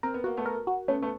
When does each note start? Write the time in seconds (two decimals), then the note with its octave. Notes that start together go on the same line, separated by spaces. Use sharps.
0.03 C4 A#4
0.14 B3
0.24 A#3 F#4
0.37 A3 B3
0.46 A#4
0.67 F#4
0.88 A3 B3 C#4
1.02 A3 B3